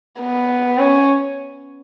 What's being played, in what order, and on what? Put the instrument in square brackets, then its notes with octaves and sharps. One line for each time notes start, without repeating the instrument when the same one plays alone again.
[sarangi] B3
C#4